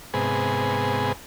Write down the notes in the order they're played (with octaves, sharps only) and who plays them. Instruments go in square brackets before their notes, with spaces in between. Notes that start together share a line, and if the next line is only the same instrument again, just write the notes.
[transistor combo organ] G#2 C3 B3 G#4